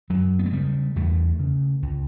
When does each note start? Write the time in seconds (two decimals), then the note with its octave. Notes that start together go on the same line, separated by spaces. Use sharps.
0.10 F#2 F#3
0.39 B3
0.46 A3
0.52 C#3 G3
0.96 E2 A3
1.39 C#3
1.82 C#2